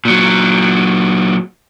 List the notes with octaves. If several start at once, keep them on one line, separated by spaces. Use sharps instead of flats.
A#2 F#3